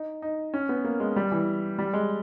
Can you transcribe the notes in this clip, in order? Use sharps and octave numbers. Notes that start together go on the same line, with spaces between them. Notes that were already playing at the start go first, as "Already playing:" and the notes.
Already playing: D#4
D#4
C#4
B3
A#3
G#3
G3
E3
G3
G#3